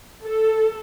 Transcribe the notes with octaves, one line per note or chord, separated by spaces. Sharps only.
A4